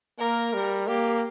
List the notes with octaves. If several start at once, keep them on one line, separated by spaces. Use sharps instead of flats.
A#3 A#4
G3
A#3 G4